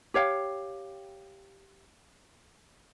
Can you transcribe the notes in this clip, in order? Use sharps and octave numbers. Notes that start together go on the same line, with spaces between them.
G4 C#5 F5 G5